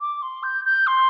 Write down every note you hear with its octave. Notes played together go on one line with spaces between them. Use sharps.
D6
C6
G6
G6
C6